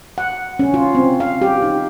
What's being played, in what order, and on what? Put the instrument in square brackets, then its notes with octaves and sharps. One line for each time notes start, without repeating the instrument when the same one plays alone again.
[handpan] F#5
C#4
F4
C4
F5
G4
D#4